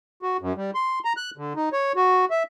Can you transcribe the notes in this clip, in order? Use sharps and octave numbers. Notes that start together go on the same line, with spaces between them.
F#4
F#2
G3
C6
A#5
F#6
D3
D#4
C#5
F#4
E5